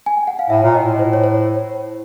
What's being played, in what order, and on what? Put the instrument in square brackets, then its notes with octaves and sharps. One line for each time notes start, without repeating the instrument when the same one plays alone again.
[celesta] G#5
G5
F#5
F5
[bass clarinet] A2 [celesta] E5
[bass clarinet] A#2
[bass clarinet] A2 [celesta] D#5
[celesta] C5
C#5
C5